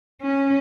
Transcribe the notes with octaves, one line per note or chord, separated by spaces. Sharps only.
C#4